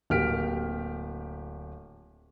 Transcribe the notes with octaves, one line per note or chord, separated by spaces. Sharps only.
D1 A#3 G4 F6 B6 D7